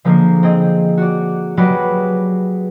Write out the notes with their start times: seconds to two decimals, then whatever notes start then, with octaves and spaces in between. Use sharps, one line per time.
0.05 D3 F3 G#3 A#3
0.43 C4 G#4 D#5
0.97 F#4 D5
1.57 F#3 G#3 F#4 G4 B4 D5